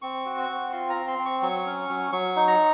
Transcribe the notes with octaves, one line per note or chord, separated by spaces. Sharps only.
C4 C#6
F#4
C#6
C4
F4 C6
A#5
C4
C6
C4
C#6
F#3 C#6
C#4
F#3
F#3 C#6
D#4
A#5